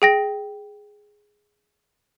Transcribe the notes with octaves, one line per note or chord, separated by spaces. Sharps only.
G#4 G5 A#6